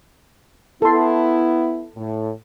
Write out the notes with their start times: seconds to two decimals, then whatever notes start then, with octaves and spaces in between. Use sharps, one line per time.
0.82 B3 E4 A4 C6
1.96 A2